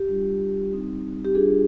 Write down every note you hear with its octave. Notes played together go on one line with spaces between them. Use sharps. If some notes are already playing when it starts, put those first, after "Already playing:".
Already playing: G4
G3 D4 F4
G3 C4 D#4
G4
G3 D4 F4 G#4